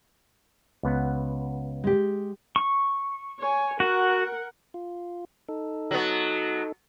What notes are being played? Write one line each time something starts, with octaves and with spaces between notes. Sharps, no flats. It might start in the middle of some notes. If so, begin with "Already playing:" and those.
C#2 B3 F#5
G#3 G4
C#6
C#5 G#5
F#4 A#4 F#5
F4
D#4 A4
F#3 B3